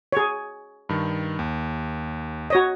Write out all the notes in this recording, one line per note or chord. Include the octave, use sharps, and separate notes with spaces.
G#4 C#5
G2 D#3
D#2
F#4 C#5 D#5